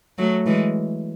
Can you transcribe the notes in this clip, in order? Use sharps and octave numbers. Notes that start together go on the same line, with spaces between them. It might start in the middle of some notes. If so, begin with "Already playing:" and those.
F#3 A3
E3 G#3